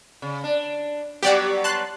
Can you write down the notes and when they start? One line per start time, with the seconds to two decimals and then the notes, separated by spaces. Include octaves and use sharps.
0.22 C#3
0.44 D4
1.23 F#3 G3 B3 G4 D5 F#5
1.64 A5 C6 F#6